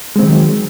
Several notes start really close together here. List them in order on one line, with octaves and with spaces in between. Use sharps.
G#3 C4 D#3 F#3